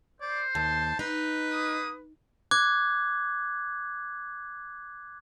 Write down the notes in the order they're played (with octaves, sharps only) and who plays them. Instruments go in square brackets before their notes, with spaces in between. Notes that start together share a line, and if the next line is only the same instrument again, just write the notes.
[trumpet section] C5 [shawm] D5
[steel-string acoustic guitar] D#2 [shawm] A5
[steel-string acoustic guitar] D#4 [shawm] B4
[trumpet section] A#3 D#6
[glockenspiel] D6 F#6 G#6